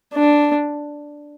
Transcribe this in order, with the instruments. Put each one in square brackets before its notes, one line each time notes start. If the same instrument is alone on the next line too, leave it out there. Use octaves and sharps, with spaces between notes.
[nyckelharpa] D4